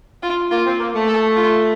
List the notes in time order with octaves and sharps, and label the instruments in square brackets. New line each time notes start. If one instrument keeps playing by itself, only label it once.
[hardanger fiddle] F4
[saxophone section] A#3 [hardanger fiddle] F4
[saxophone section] C4
A#3
A3
[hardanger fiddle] A4
F4